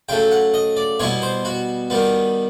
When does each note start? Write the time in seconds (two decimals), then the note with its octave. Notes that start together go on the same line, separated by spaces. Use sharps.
0.09 C#3 F#3 A3 G5
0.31 F#5
0.54 D#5
0.77 D5
1.00 B2 G3 B3 E4 C#5
1.22 C5
1.45 F#4
1.90 D#3 G3 B3